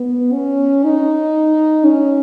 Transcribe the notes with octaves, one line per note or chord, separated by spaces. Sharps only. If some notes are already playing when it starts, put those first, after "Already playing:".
Already playing: B3
C#4
D#4
C#4